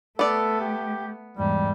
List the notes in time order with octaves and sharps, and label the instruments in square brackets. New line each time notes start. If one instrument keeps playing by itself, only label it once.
[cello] A3 [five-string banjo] B3 D5 [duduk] A4
[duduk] G4
[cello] E2 G#2 [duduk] G3